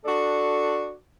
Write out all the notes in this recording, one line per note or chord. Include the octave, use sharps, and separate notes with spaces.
D4 F#4 A4 D5